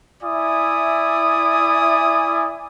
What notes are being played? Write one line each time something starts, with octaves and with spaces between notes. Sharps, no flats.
E4 D5 E5 G#5 D#6